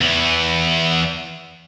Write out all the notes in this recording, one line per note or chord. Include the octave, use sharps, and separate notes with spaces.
E2 E3